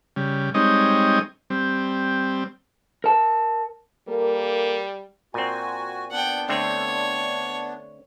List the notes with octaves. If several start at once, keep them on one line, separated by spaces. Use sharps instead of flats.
C#3 G3
G3 G#3 C4 D#4 C#5 D#5
G3 C4
A#4 A5
G3 A#3 A4 A#4
A#2 C4 F#4 G#5
B3 D4 F#5 G5
D3 A3 C4 C#5